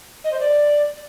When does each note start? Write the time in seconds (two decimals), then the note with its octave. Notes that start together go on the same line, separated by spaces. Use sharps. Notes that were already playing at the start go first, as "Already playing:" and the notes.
0.24 D#5
0.32 C5
0.40 D5